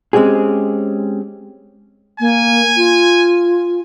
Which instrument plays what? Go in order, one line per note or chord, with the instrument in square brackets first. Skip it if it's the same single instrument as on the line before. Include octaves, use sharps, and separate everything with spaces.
[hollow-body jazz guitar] G#3 C4 C#4 G4 G#4
[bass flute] A#3 [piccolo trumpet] G#5
[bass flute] F4